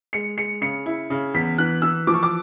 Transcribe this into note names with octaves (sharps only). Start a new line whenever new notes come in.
G#3 C#7
G#3 C#7
C#3 C#7
E4
C#3
E2 B6
E3 F#6
E3 E6
F3 D6
C#6
D6